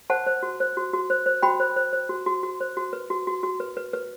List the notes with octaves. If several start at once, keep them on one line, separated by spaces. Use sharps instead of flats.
C5 F#5 A5
C5
F#4
C5
F#4
F#4
C5
C5
F#4 G5 B5
C5
C5
C5
F#4
F#4
F#4
C5
F#4
B4
F#4
F#4
F#4
B4
B4
B4